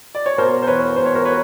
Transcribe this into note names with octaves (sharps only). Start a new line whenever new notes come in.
D5
C#5
B2 A#4 C5
C5
E2 B4 C#5
E1 C5
C#5
A#4 C5
B4 C#5